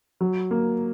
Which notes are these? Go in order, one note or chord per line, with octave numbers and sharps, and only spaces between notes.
F#3
A#3